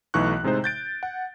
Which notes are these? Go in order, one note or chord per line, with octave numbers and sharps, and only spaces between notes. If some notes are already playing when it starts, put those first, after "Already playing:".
B1 E3 A3 D#4 C#6 F#6
A2 C3 G#3 D#4 C5
G6 A6 D7
F#5